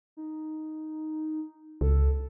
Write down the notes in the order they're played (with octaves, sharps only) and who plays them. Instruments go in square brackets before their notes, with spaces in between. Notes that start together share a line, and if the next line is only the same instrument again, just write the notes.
[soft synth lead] D#4
[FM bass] C#2 [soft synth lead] A4